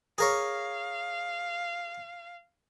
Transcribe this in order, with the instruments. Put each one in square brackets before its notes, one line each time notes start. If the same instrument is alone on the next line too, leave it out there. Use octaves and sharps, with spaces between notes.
[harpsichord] G#4 A#4 C#5 [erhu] F5